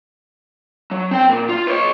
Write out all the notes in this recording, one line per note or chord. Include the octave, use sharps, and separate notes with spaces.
F#3
C4 G5
A#2
F4
B4 C#5